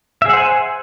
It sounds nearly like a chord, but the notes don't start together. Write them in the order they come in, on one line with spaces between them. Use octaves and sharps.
E5 G#4 F#5 C5 G#5